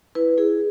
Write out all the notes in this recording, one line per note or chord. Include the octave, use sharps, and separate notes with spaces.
E4 B4
E4 G#4